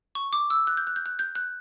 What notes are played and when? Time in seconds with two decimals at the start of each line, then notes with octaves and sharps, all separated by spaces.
0.15 C#6
0.33 D6
0.50 E6
0.67 F#6
0.77 G6
0.87 F#6
0.96 G6
1.06 F#6
1.19 G6
1.35 F#6